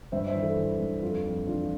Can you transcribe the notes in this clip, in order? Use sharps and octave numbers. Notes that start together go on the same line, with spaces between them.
G2 C5 E5
C5 E5
E3
A4 C5
E3
G2
F2 F4 A4
F2
E3 D4 F4